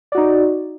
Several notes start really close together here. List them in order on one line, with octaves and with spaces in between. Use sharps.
D5 F#4 D#4